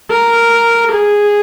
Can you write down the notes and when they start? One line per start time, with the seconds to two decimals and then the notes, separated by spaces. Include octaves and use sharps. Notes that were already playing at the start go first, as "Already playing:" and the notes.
0.10 A#4
0.93 G#4